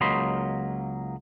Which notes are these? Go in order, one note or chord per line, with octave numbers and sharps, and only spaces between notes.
C#2 F#3 A#3 D#5 B5 C6